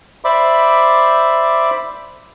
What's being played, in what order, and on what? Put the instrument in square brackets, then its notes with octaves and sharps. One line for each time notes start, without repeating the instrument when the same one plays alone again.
[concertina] C5 D5 E5 B5 D6